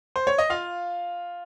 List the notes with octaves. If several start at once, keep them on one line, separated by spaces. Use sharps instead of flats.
C5
C#5
D#5
F4 F5